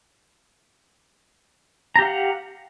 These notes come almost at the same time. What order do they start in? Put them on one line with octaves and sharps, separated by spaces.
A#5 G4 F5 F#5